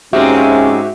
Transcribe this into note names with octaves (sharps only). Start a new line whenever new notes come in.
G#2 G#3 A#3 C4 C#4 F#4 G4 E5